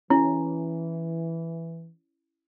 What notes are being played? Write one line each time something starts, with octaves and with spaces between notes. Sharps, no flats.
E3 C#4 E4